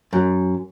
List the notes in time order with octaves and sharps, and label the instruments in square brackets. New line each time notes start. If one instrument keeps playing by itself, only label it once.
[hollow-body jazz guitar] F#2